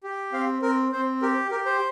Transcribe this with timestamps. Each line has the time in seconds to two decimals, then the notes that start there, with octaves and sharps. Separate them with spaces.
0.03 G4
0.32 C4 F5
0.62 C4 A#4
0.92 C4 C5
1.22 G4 A#4
1.51 G4 A#4
1.66 C5